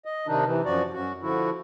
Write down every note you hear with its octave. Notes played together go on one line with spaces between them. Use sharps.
D#5
C3 D#3 D4 D#4
C3 E3
F#2 F3 F#4 D5
F#2 F#4
D3 F3 E4 F#4